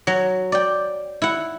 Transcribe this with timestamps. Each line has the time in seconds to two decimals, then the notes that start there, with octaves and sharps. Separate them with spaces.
0.07 F#3
0.52 D5 G5
1.22 E4 F#5